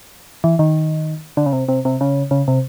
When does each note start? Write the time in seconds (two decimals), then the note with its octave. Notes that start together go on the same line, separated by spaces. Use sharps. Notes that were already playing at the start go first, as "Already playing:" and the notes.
0.44 E3
0.59 D#3
1.37 D3
1.46 C#3
1.53 C3
1.68 C3
1.85 C3
2.01 C#3
2.31 C#3
2.48 C3